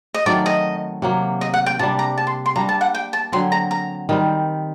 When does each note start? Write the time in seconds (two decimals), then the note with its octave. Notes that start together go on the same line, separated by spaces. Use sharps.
0.14 D#5
0.26 D#3 F#3 A3 C4 D5
0.46 D#5
1.02 C3 F#3 A#3
1.41 D#5
1.54 F#5
1.66 G5
1.79 C3 G3 D4 A5
1.99 A#5
2.18 A5
2.27 C6
2.46 C6
2.56 G3 A#3 D4 A#5
2.69 A5
2.81 F#5
2.94 G5
3.13 A5
3.32 D3 F#3 C4 C6
3.52 A#5
3.71 A#5
4.09 D#3 G3 C4